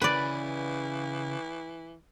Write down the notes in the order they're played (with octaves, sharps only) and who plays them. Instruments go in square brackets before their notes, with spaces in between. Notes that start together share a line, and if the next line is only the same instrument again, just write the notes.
[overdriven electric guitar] C#3 [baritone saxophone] E3 [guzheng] B4 D5